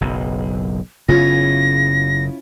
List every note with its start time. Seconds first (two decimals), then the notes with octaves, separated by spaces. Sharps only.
0.01 F#1 B1
1.08 F#1 C#3 B3 C#4 E4 F4 A#6